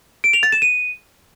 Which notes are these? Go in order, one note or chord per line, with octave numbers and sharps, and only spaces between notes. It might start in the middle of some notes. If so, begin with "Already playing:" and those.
D7
F7
A6
E7
D#7